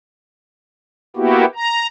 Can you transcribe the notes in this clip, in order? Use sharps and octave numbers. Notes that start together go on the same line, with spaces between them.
A#3 B3 E4 F#4 G4
A#5